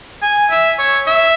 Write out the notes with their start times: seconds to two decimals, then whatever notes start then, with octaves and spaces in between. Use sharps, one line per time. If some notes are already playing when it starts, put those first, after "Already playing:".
0.22 G#5
0.51 E5
0.79 C#5
1.07 E5